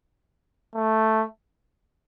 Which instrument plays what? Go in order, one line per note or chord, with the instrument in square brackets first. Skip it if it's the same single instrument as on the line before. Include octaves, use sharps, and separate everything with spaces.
[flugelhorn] A3